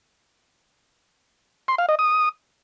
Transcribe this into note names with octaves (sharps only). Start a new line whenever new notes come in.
C6
F5
D#5
D#6